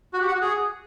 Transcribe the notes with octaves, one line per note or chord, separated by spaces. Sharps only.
F#4
G4
F#5
F#4
G#4